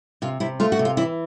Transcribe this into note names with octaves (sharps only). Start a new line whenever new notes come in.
C3 F4
C3 E4
A3 F4
F#4
C3
F4
E3 E4